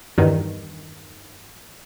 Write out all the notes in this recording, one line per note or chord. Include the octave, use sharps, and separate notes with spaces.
E2 G2 D#3